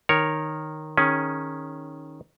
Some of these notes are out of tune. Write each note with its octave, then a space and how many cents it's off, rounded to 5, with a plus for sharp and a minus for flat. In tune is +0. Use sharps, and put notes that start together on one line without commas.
D#3 -5 A#4 +0 C#5 +0
D#3 +0 C#4 +0 G#4 +0